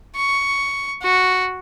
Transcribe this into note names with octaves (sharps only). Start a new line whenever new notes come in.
C#6
F#4